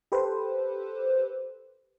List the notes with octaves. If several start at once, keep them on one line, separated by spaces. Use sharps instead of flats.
G4 A4 B4 C5